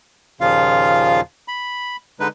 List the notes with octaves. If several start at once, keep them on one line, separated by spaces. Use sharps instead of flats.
D#2 A#2 C#3 F3 F4 F5
B5
D3 G#3 D#4 B4